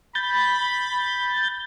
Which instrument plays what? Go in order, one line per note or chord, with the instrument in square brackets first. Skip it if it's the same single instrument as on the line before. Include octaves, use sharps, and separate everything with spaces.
[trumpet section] B5 [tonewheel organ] G6 A6